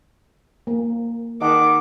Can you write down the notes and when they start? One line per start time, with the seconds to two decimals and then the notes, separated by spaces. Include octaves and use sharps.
0.67 A#3
1.41 D#3 D#5 F#5 A5 D6